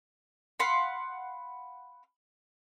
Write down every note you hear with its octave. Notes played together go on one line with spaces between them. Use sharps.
F5 F#5 B5 C6